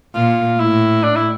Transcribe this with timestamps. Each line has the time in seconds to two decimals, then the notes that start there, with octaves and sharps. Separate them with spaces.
0.15 A#2 F4
0.59 A2 E4
1.03 D4
1.16 E4